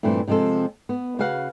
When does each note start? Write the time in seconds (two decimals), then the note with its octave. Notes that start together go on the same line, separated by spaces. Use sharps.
0.03 G2 A#2 E3 G3 A3 C4
0.28 C3 F3 G#3 C4 A4
0.89 B3
1.19 C#3 F#4 G#4 B4 F5 F#5